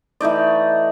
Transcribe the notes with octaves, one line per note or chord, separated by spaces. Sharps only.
E3 A3 D#4 D5